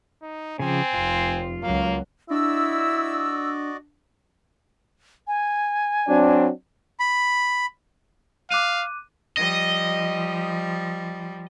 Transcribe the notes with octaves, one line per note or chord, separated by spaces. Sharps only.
D#4
C#3 F3 C4 G#5
F1 F4
C#2 F#3 A#3 F5
D4 E4 F#4 D5 D#5 E6
G#5
F#3 C4 D4
B5
F5 D6 F#6 D#7
F3 G3 D#5